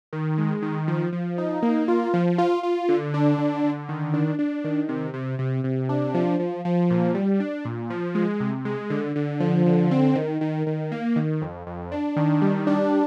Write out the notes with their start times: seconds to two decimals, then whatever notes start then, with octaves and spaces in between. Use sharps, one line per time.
0.13 D#3
0.38 G#3
0.62 D#3
0.88 F3
1.13 F3
1.38 D#4
1.63 A#3
1.88 F4
2.14 F3
2.38 F4
2.63 F4
2.89 D3
3.14 D4
3.38 D3
3.64 D3
3.89 D#3
4.14 D4
4.39 D4
4.65 D#3
4.89 C3
5.14 C3
5.39 C3
5.64 C3
5.89 D4
6.14 F3
6.40 F3
6.65 F3
6.90 A#2
7.15 G3
7.40 D4
7.65 A#2
7.90 F3
8.15 G#3
8.40 C3
8.65 G#3
8.90 D3
9.16 D3
9.40 F3
9.66 D3
9.91 C4
10.16 D#3
10.41 D#3
10.67 D#3
10.92 A#3
11.16 D#3
11.42 F2
11.67 F2
11.92 D4
12.16 D#3
12.42 G3
12.67 D4